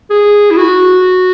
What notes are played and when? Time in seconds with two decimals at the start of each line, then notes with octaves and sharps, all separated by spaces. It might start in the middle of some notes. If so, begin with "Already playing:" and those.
0.10 G#4
0.51 E4
0.57 F#4